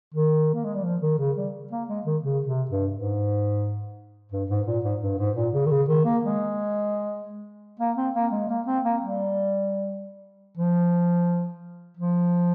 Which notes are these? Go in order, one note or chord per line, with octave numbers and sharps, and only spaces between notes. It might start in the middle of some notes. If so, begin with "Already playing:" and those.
D#3
A#3
G#3
G3
F3
D#3
C#3
G3
A#3
G#3
D#3
C#3
C3
G2
G#2
G2
G#2
A#2
G#2
G2
G#2
A#2
C#3
D#3
C#3
D#3
A#3
G#3
A#3
C4
A#3
G#3
A#3
C4
A#3
G3
F3
F3